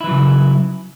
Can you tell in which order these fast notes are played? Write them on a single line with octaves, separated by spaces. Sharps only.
E4 E3 F#3 C#3